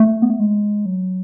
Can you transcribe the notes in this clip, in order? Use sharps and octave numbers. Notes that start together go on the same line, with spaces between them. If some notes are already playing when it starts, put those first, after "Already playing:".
Already playing: A3
B3
A3
G#3
F#3